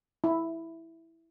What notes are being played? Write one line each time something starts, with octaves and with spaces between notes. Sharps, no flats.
E4